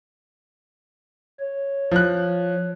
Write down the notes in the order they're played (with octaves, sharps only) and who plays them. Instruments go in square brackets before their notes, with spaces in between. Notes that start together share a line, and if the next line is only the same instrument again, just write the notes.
[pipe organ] C#5
[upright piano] F3 F#6